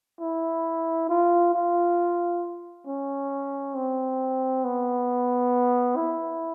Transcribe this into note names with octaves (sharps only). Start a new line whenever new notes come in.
E4
F4
F4
C#4
C4
B3
E4